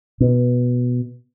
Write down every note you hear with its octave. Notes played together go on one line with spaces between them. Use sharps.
B2